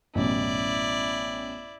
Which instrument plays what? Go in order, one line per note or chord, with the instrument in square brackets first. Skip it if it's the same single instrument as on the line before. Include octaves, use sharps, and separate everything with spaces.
[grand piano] A1 F#2 B2 [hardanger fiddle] E4 D5